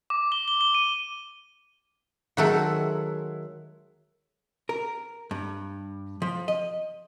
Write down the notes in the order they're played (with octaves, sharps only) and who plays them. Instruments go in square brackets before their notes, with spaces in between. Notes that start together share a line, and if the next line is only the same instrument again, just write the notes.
[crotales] D6
G7
G7
G7
D#7
[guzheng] D#3 F#3 A4 [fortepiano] G#3 E5 F#5
[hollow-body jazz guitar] A#4
G2
F3
D#5